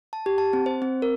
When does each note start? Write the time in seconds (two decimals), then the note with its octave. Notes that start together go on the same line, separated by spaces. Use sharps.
0.13 A5
0.26 G4
0.38 A5
0.53 C4
0.66 C5
0.82 C4
1.02 A#4